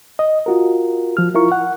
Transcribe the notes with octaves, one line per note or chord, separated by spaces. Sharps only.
D#5
F4 F#4 A#4
F3 F6
E4 F4 A#4 C#6
F#5